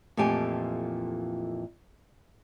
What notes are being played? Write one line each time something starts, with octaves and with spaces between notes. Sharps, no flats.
F2 A#2 E3 A3 G4 G#5